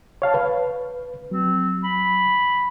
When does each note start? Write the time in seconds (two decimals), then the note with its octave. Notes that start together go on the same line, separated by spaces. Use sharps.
0.22 C#5 F5 A5
0.34 B4
1.31 F#3 C4
1.84 B5